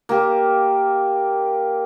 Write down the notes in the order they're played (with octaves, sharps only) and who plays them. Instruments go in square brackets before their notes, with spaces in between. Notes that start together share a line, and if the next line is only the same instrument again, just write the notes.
[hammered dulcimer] A#3 G4